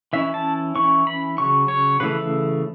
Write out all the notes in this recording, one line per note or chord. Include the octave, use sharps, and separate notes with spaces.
E3 C#4 E4 E5
A5
E3 C#4 E4 C#6
B5
C#3 F#3 C#6
C#5
C#3 E3 A3 B4